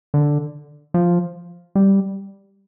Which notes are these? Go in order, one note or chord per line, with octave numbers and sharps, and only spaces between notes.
D3
F3
G3